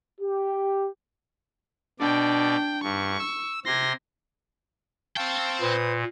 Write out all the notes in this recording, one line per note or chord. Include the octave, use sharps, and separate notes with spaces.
G4
B2 D4 D5 G5
G2 C#6
E6
C3 C6 G#6 A#6
C4 F5 G5 A5 C#6
A#2 B4 C5 D#6